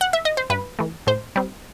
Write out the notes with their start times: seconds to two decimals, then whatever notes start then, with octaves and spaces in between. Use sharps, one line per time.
0.01 F#5
0.13 E5
0.25 D#5
0.37 C5
0.50 G2 B4
0.79 E3 A3
1.07 A2 C5
1.36 G3 C4